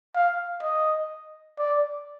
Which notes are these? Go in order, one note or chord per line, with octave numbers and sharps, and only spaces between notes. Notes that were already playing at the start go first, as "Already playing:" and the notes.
F5
D#5
D5